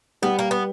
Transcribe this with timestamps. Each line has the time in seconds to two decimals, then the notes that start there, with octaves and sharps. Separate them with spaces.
0.22 G3 B3
0.39 A#3
0.51 B3